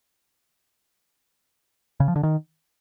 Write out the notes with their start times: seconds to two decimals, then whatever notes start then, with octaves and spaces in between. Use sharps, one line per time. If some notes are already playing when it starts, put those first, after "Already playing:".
2.00 C#3
2.08 F3
2.16 D3
2.23 D#3